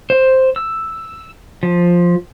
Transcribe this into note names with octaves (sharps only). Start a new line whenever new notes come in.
C5
E6
F3